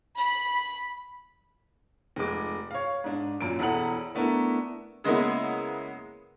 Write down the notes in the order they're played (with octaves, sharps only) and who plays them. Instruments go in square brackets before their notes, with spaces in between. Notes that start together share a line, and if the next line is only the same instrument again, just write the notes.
[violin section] B5
[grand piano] F1 G#3 D6
C#5 F5
G#2 D4
F#2 A#2 D7
E1 E2 E4 A4 F#5 F#7
A3 B3 D4 E4 A#4
[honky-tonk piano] C#3 G#3 A#3 B3 E4